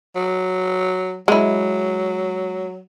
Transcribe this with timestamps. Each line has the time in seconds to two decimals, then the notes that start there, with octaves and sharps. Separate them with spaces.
0.16 F#3
1.28 F#3 G#3 E4